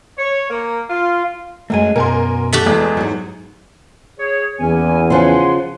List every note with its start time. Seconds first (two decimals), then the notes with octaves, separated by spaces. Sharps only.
0.18 C#5
0.50 A#3
0.90 F4
1.70 F#2 F#3 G#3 A3 G#5
1.96 F#2 B2 A#4 G#5 C6
2.53 A3 F#4 G4
2.66 E2 G#3 B3
2.97 G#2 F#3
4.18 G#4 C#5
4.60 E2 A#3 C#4 G#5
5.10 C#3 F3 F#5 G#5 C6